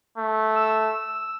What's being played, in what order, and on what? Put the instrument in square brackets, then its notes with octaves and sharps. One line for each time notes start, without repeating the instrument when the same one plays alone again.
[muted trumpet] A3
[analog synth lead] E6